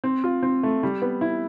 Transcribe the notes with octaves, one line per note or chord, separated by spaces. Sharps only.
C4
F4
C4
A3
G3
B3
E4